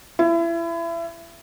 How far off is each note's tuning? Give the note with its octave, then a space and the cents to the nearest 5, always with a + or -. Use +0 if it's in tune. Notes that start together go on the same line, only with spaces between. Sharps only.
E4 +30